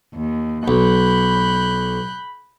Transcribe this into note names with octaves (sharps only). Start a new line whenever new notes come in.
D#2
B1 B5 F#6 G6